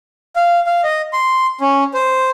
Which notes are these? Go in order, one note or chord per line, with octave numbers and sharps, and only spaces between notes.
F5
F5
D#5
C6
C#4
C5